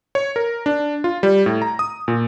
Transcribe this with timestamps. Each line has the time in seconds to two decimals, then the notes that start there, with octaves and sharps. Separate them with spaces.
0.15 C#5
0.36 A#4
0.66 D4
1.04 F4
1.23 G3
1.46 A2
1.62 A#5
1.79 D#6
2.08 A#2